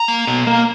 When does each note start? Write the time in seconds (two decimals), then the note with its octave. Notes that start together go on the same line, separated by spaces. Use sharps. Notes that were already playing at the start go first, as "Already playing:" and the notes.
Already playing: A#5
0.08 A#3
0.27 B2
0.47 A#3